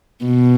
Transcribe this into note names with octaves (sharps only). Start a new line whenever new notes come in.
B2